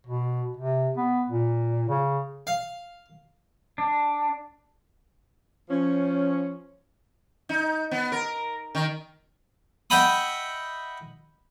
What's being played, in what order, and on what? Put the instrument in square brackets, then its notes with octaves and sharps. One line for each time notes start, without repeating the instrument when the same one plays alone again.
[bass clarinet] B2
C3
B3
A#2
C#3
[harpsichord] F5
[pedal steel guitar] D4
[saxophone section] F3 C#4
[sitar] D#4
B3
A#4
D#3
[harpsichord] D#5 E5 F#5 G5 B5 D#6